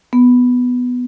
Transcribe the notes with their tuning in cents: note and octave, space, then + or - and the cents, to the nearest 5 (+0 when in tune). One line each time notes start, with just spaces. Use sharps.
B3 +5